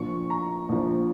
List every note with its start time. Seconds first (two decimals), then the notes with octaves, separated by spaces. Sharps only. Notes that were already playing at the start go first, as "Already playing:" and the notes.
Already playing: A#1 A#2 F3 C#6
0.30 A#5
0.69 A#1 A#2 F3